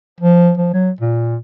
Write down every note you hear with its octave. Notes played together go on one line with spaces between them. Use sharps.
F3
F3
F#3
A#2